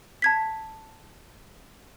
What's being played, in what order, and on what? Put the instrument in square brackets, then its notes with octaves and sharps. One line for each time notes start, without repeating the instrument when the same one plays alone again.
[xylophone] A5 G#6 B6